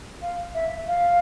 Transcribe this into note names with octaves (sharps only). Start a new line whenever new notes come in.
F5
E5
F5